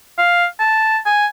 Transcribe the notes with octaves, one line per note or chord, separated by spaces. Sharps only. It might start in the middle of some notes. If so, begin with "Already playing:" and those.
F5
A5
G#5